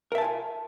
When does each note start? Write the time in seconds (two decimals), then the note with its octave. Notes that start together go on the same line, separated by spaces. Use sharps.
0.12 A#4
0.15 E5
0.18 A5
0.21 G#5
0.24 F4